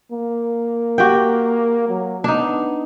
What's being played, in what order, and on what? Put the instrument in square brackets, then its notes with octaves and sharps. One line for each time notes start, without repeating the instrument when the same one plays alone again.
[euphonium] A#3
[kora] F#4 G4 G5
[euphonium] F#3
[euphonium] B3 [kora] D4 D#4